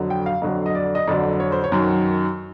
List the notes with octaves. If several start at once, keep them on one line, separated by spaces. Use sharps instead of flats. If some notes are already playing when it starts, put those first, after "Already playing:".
Already playing: F2 D3 F#3
G5
F5
F2 D3 F#3
D#5
D5
D#5
F2 D3 F#3 D5
C#5
C5
C#5
F#2 D#3 F#3